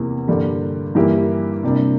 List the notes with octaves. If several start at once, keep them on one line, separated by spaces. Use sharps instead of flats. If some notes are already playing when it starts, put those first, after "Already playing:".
Already playing: E2 C3 E3 A#3
G2 D3 G3 A#3
G2 E3 A#3 E4 G4
C3 G3 A#3 D4